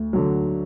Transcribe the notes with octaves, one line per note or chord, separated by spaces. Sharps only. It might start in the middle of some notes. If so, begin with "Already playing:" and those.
Already playing: D2
D3 F#3